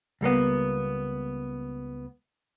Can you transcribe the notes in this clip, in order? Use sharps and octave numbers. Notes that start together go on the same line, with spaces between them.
C#2 G3 A#3 B3